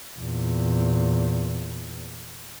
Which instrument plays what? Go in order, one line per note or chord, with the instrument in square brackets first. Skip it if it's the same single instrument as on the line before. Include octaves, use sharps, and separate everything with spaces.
[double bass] E2 A#2